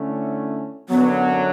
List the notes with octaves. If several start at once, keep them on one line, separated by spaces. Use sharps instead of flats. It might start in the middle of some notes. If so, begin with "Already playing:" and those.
Already playing: D3 A3 C#4 E4
F#2 D3 F#3 B3